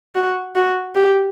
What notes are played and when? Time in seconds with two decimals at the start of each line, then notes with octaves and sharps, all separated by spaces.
0.15 F#4
0.56 F#4
0.95 G4